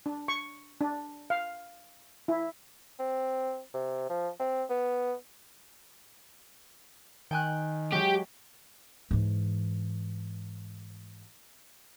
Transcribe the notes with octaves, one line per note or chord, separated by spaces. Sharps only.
D4
C#6
D4
F5
E4
C4
C3
F3
C4
B3
D#3 G5 G#5 F#6
F#3 G#3 G4
G#2 E3